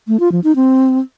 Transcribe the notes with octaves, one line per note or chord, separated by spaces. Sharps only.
A3
F4
F3
D#4
C4